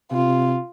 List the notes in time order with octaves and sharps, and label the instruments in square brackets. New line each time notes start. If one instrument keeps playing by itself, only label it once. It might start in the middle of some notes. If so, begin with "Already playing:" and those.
[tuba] C3 [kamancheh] F4